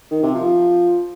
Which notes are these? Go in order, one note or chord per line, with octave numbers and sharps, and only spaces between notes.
D#3
C3
F3